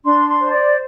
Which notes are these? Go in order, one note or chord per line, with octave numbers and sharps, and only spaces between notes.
D4 C6
C6
C5
D5